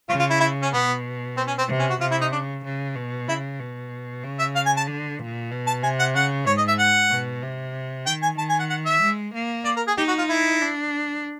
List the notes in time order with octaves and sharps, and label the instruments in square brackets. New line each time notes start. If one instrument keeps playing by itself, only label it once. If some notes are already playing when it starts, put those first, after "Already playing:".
[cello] C#3 [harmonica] F4
[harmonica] F4
E4
E4
C#4
[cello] B2 [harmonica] B3
[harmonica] C4
C#4
C4
[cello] C3
[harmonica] C#4
F#4
[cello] C3 [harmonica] F4
[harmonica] E4
D#4
[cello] C#3 [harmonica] D4
[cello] C#3
B2
[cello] C#3 [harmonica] E4
[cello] B2
C#3
[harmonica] E5
F5
G#5
A5
[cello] D3
A#2
B2
[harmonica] A5
[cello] C3 [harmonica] G#5
[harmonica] F#5
[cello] C#3 [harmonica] F#5
[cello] G#2 [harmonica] C#5
[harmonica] D#5
E5
F#5
[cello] B2
C3
[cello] D#3 [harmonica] G5
[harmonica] G#5
[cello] D#3 [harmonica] A5
[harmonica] G#5
F#5
F#5
E5
[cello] G#3
A#3
[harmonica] D5
A#4
G#4
[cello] D#4 [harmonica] G4
[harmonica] F#4
F4
E4
[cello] D4